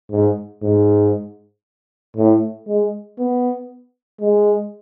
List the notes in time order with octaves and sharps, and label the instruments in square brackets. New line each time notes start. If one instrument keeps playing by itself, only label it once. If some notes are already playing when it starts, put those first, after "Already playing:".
[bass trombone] G#2
G#2
A2
G#3
B3
G#3